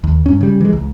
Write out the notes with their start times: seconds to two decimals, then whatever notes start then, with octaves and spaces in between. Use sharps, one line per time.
0.04 D#2
0.26 G2 C#4
0.41 C#3 G3
0.61 E3 G#3
0.73 C#2